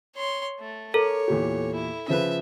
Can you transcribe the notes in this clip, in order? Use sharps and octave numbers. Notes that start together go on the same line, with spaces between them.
C#5 C6
A3
A4 A#4 C#5
E2 A#2 G4
E4
C#3 F3 B4 E5